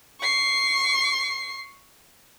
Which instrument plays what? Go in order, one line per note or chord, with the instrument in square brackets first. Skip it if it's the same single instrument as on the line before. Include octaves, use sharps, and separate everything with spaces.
[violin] C#6 C7